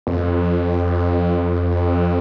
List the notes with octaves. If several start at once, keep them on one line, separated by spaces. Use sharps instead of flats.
F2